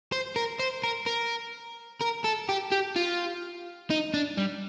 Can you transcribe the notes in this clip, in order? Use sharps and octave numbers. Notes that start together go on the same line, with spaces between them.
C5
A#4
C5
A#4
A#4
A#4
A4
G4
G4
F4
D#4
D4
G3